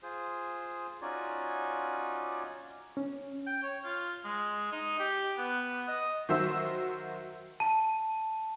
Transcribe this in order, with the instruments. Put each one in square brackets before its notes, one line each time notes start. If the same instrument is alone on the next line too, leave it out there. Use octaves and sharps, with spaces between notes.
[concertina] F4 G#4 C5
C#4 D#4 F4 F#4 D5 G#5
[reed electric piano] C#4
[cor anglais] G5
C#5
F4
G#3
D#4
G4
B3
D#5
[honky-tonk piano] D#3 F#3 F#4 C5 E5 E6
[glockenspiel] A5